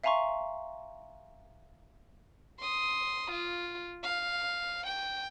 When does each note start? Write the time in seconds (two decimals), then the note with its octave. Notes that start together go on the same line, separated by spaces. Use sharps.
0.04 E5 F5 G#5 A#5 C6 C#6
2.60 C6 D#6
3.31 F4
4.03 F5
4.87 G5